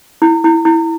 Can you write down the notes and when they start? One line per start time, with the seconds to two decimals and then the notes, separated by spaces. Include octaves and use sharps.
0.22 E4
0.44 E4
0.65 E4